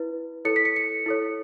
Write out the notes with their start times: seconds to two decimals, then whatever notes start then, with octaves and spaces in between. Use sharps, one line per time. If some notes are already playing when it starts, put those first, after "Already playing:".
Already playing: E4 B4
0.45 E4 A4 C#5 C#7
0.56 B6
0.65 C#7
0.76 C#7
1.06 E4 A4 C#5